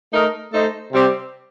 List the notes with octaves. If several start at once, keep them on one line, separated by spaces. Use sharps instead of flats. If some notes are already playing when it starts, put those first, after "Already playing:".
A3 D#4 A#4 D#5
A3 D#4 A4 C5 D#5
C3 G3 C4 G4